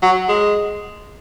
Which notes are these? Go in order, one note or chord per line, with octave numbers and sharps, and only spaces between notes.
F#3
G#3